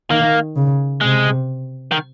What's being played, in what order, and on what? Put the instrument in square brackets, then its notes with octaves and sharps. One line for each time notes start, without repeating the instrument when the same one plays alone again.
[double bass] D#3 [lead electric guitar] A#3
[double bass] C#3
[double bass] C3 [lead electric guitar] G#3
[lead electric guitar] D#3